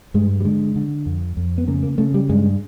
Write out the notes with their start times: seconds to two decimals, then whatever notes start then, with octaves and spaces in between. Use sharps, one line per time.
0.14 G2 G#3
0.40 G3
0.45 D3 G#3
0.76 D3
1.06 F2
1.37 F2
1.58 B3
1.67 C#3 A#3
1.83 A#3
1.98 C#3 A3
2.14 G3
2.29 G2 G#3